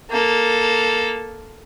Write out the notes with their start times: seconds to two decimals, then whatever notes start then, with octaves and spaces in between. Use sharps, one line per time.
0.10 A#3 A4